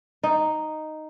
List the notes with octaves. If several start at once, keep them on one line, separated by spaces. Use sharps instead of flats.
D#4